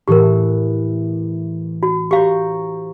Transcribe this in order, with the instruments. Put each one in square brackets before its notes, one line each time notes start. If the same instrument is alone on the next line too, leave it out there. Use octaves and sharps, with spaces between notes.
[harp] A2 E3 [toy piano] G4 A#4
[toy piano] F#4
[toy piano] G4 F5 [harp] C5 A#5 C#6